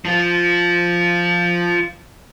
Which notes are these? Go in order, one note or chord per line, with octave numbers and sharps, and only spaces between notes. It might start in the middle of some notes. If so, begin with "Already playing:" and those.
F3 F4